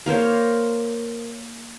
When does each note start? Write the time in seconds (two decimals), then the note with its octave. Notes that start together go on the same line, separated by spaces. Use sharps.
0.06 A#3 A#4 C5 C#5